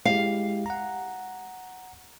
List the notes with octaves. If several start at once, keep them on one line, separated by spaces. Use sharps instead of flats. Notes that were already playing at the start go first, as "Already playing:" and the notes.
G#3 E4 G4 F5
F#5 A#5